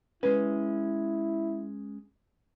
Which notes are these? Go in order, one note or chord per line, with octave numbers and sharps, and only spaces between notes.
G#3 C#4 E4 B4